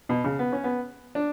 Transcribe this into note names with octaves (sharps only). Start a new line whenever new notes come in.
B2
C#3
B3
C#4
B3
D4